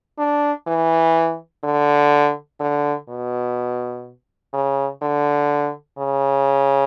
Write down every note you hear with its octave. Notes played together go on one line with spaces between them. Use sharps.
D4
E3
D3
D3
B2
C#3
D3
C#3